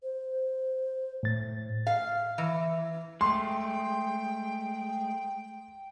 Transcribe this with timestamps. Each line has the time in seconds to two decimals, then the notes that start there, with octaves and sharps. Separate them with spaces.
0.03 C5
1.23 A2 A6
1.87 F5
2.38 E3
3.21 G#3 A3 G5 C6